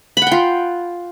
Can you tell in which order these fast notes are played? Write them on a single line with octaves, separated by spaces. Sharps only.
B5 F#5 G5 F4